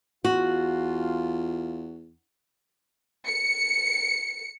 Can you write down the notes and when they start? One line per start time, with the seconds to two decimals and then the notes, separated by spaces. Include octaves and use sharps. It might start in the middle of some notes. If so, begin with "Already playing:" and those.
0.25 E2 F4 F#4
3.27 C#7